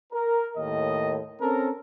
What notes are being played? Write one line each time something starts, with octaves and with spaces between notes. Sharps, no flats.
A#4
D#2 A2 D#3 D#5
C4 C#4 A4 A#4